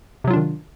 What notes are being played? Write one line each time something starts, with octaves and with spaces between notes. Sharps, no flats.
C3 D#3 F#3 D4 F4